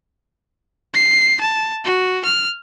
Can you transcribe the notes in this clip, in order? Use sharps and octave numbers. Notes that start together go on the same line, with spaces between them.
C7
A5
F#4
F6